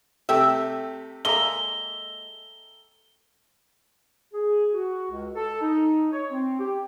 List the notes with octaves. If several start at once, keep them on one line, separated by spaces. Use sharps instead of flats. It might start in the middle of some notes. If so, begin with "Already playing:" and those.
C3 A3 G4 E5 G5
G#3 A#3 A4 E5 A#5 G7
G#4
F#4
C#2
A4
D#4
C#5
C4
G4